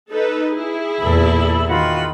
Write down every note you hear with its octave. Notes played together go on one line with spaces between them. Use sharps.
D#4 A4 B4
E4 G#4
E2 A#2 A4 B5
D#3 F4 F#4 B5